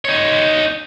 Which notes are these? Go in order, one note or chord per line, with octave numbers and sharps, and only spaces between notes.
D#4 C#5